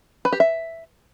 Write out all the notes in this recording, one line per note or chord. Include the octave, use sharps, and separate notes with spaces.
B4
G4
E5